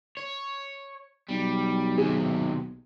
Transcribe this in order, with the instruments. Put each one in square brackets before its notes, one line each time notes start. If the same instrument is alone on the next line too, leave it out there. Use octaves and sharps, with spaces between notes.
[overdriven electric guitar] C#5
[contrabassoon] B1 [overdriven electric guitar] G3
[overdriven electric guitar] D#2 C3 [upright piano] G#4